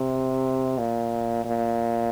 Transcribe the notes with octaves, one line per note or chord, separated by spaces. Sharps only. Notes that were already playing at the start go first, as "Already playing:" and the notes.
Already playing: C3
A#2
A#2